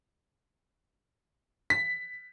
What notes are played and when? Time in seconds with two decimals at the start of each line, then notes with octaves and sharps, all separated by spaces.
1.70 B6